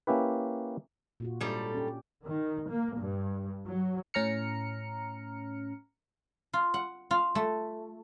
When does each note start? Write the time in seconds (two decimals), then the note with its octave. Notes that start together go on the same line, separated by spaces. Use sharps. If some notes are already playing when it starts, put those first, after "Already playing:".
0.07 A#3 C#4 E4 G4 B4
1.20 A#2 F4 F#4
1.40 G#2 G3 D4 A4 C#5
1.74 C#4 G4
2.25 D#3
2.69 A#3
2.99 G2
3.66 F#3
4.14 A2 C#4 A#5 F6 C#7
6.53 F4
6.74 F#5
7.11 F4
7.35 A3